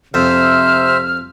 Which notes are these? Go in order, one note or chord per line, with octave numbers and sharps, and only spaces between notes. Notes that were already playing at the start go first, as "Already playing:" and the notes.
F2 C3 C5 E5 E6 F6